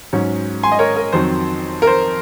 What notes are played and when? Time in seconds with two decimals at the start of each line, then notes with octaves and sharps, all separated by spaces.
0.13 G#2 F#3 C#4
0.63 G#5 C6
0.72 D#5
0.79 A#4 C#5
0.96 A#4
1.13 F2 D#3 F#3 C4 C5
1.82 A#4
1.87 C5